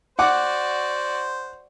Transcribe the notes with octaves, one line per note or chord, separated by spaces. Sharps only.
F#4 C5 D5 F#5 D6